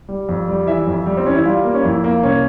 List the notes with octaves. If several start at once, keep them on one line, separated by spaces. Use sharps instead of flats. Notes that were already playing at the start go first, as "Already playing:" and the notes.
G3
F2
G3
E3 E5
F2
G3
C4
E3 C#4
E4
G3 F4
A#3
C#4
F2 E4
A#3
C2 C#4